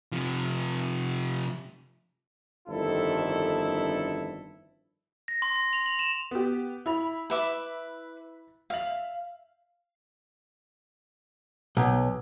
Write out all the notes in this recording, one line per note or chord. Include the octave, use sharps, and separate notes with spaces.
C3 F3
G1 F2 D#3 D4 E4 A4
A#6
C6
A#6
F7
F#7
E7
B3 G4
E4 B5 F7
B4 E5 D6
E5 F5 F#7
B1